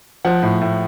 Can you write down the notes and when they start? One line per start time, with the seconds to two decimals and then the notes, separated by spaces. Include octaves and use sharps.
0.25 F3 F#5
0.43 A2
0.61 A2